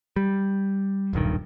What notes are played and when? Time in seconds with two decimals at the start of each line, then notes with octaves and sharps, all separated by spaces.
0.16 G3
1.13 D#1 B1 G2 D#3